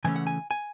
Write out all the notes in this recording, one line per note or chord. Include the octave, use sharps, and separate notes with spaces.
C#3 E3 A3 C#4 G#5
F#5
G#5
G#5